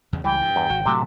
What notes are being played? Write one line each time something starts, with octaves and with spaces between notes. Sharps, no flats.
E2 C#3
C#2 E3 G3 G5
G2
E2
G#1 F#4
A2 C3 F#3 A3 F#4 A5